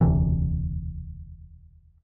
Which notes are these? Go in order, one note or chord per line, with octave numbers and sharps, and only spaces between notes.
E1 D2 C3 E3